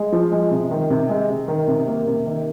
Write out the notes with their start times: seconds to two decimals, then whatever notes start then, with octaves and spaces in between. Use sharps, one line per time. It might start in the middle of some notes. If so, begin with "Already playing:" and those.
Already playing: G#3
0.12 F3
0.32 G#3
0.51 C3
0.71 D#3
0.90 C3
1.09 G#3
1.29 C3
1.48 D#3
1.68 C3
1.88 A#3
2.07 C3
2.26 D#3